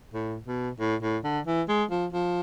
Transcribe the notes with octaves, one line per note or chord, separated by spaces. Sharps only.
A2
B2
A2
A2
D3
E3
G#3
F3
F3